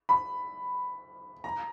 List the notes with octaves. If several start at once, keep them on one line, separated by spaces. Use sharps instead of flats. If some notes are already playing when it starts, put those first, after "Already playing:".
B5
A#5